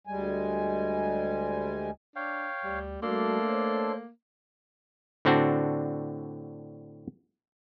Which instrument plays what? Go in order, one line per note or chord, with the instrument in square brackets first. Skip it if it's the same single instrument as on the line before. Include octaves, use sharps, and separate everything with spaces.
[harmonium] D2 G3 G#3 G#5
[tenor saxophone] D4 [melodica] C#5 F5 G5
[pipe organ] D2 [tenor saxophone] G3
[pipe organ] G3 F#4 [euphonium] A3 [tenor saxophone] A#3 [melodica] D4 A4 C6
[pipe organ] C5 C#5
[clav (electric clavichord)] A2 D3 C4 D4 F#4